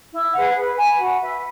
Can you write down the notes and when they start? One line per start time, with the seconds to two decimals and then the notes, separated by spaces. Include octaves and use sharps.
0.12 E4
0.33 G#4 B4 F#5
0.55 B4
0.77 G#5 B5
0.99 F#4
1.20 B4 E5